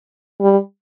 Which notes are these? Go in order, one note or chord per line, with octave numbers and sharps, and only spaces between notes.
G3